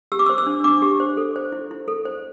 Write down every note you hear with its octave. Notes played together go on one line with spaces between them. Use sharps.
G4 E6
D6
E6
C5
E6
D4
D4 D6
G4
C5
A4
C5
E4
E4
A4
C5